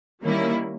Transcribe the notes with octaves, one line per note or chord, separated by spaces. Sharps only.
D#3 G3 A#3 C#4 E4